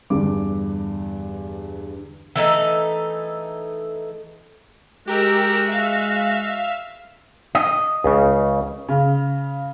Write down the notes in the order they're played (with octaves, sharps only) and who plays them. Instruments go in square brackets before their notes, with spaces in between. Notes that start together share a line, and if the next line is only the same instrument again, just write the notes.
[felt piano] E2 G2 D3 D6
[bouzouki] E3 A3 D#4 A4
[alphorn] G#3 [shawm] F#4 [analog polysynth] G4 A#4 E6
[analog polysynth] E5 F5
[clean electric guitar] D#5
[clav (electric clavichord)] C#2 C#3
[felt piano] C#3